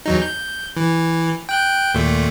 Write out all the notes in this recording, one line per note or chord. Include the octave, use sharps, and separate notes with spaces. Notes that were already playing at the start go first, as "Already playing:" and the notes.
E2 F#3 D#4
G6
E3
G5 F#6 G6
D#2 A#2 A3